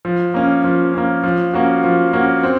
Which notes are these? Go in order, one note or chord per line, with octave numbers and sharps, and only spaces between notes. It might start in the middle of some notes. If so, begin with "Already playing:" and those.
F3
A#3 C#4
F3
A#3 C#4
F3
A#3 C#4 F#4
F3
A#3 C#4 F#4
C4